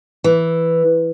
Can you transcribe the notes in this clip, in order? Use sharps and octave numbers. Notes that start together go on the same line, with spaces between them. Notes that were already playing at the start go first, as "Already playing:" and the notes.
E3